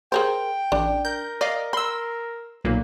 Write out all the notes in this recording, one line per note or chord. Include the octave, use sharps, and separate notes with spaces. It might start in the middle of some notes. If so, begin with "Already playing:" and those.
G#4 A#4 C5 G5
A1 D4
A#4 G6
D5 D#5 F5
B5 C6 E6
B1 A#2 A#3 B4